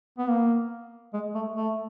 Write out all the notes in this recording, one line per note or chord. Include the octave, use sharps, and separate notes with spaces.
B3
A#3
G#3
A3
A3